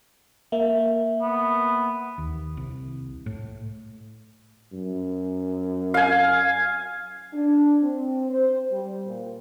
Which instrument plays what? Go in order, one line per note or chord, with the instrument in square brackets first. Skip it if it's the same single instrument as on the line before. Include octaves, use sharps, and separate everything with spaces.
[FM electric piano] A#3 [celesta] E5
[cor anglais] B3
[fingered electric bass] D#2
C2
A2
[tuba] F#2
[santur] F5 G#5
[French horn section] D4
C4
C5
G3
A#2